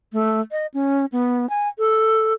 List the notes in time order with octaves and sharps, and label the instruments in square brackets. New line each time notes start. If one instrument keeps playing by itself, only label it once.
[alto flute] A3
D#5
C#4
B3
G#5
A4